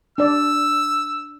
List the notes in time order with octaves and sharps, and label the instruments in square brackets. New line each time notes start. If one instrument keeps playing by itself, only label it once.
[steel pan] D4 D5 [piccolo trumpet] E6